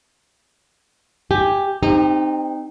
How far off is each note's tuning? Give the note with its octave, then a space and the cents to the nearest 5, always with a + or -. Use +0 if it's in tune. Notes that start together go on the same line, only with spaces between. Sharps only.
G4 +5 G#5 +0
C4 -15 D#4 -20 G4 +25